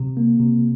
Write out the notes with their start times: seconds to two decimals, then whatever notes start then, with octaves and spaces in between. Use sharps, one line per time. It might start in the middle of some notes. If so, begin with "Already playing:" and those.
Already playing: C3
0.17 A#3
0.39 C3